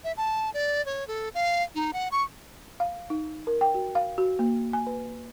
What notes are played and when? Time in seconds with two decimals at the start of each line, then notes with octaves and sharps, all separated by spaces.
0.04 E5
0.17 A5
0.54 D5
0.86 C#5
1.08 A4
1.34 F5
1.75 D#4
1.93 F#5
2.12 C#6
2.80 F5
3.10 D#4
3.47 A#4
3.61 G5
3.74 F#4
3.95 F5
4.18 F#4
4.39 A#3
4.73 G#5
4.87 B4